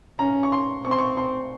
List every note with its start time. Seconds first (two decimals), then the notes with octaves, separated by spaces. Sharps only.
0.19 C#4 A#5
0.43 C#6
0.52 C6
0.85 C4 C#6
0.91 C6
0.98 C#6
1.17 C6